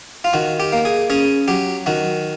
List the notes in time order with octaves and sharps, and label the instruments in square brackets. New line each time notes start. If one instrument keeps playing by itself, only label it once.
[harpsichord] F4
D#3 F#4
G4
A#3
G#4
C#4 G#4
F#3 G4
D#3 F#4